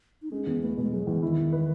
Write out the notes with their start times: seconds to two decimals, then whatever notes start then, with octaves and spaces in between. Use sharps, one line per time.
0.22 D#4
0.31 G#3 C#4
0.47 E2 B3
0.62 A3 B3
0.77 B2 G#3
0.92 F#3 G#3
1.07 E2 E3
1.22 D#3 E4
1.38 E3
1.52 B4